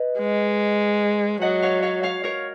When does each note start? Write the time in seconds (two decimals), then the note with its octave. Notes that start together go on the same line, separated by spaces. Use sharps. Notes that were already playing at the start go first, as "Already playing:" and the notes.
Already playing: B4 D#5
0.19 G#3
1.42 F#3 D#5 F#5
1.62 C#5 F5
1.83 C#5 F5
2.03 C#5 F5
2.24 A#4 C#5